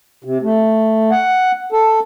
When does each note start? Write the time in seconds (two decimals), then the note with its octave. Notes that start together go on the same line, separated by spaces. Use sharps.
0.24 C3
0.43 A3
1.11 F#5
1.72 A4